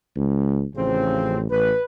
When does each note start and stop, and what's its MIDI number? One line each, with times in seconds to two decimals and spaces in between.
0.16 0.64 37
0.75 1.49 33
0.75 1.39 49
0.75 1.39 53
0.75 1.39 60
1.51 1.71 33
1.51 1.82 71